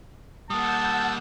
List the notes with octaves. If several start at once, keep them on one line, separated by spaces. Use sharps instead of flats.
G3 A#3 F#5 A5 D#6 E6 G6